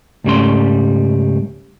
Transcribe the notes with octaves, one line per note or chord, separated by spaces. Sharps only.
C#2 G#2 G3 A3 C#4 C6